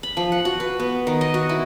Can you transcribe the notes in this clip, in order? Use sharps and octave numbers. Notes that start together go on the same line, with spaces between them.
B5
F3
F#5
F#4
B4
B3
D#3
D#5
F#4
E4